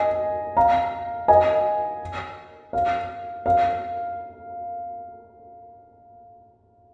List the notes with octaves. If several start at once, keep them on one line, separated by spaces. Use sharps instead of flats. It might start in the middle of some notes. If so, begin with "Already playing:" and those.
Already playing: D#5 G#5
F5 A#5
D#5 G#5
F5
F5